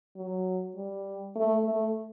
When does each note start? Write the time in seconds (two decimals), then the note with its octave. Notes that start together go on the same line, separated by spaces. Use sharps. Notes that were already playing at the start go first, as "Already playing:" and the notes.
0.16 F#3
0.76 G3
1.36 A3
1.65 A3